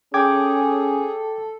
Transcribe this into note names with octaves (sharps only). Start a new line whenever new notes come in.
C#4 G#4 A4 G5 D6 G#6